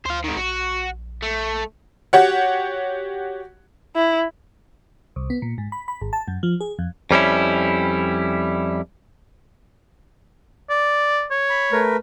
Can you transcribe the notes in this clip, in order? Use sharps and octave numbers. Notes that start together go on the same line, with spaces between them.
D2 C5 F5
G#2 D#3
A#1 F#4
A3
F#4 G4 C#5 F#5
E4
C2
B3
A#2
G#2
B5
B5
G#1
A5
F#2
F3
G#4
F2
F2 G3 C#4 E4
D5
C#5
B5
A3 A#4 B4